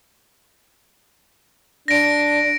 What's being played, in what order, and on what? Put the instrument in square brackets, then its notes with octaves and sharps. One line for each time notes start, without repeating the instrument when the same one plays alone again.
[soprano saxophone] D4 [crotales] A#6 D7